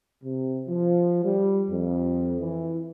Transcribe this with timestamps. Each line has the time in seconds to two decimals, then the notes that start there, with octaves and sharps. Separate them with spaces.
0.24 C3
0.68 F3
1.23 G3
1.68 F2
2.39 E3